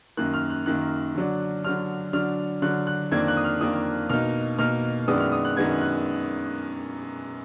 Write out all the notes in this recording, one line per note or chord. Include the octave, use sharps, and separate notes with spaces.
F#2 D#3 A#3 F#6
F6
F#6
F#2 D#3 A#3 F#6
D3 F#3 D4
D3 F#3 D4 F6
D3 F#3 D4 F6
D3 F#3 D4 F#6
F#6
F2 D#3 A#3 D4 G#6
F#6
D#6
F6
F2 D#3 A#3 D4 D#6
B2 A#3 D#4 F6
B2 A#3 D#4 F6
F#2 D#3 G#3 B3 D4 D#6
F6
D#6
F#6
F#2 D#3 G#3 B3 D4 G#6
F#6